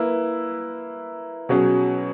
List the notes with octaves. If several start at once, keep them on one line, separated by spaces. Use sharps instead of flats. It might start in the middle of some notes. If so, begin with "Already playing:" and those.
Already playing: A#3 E4 B4
B2 F#3 C#4 G#4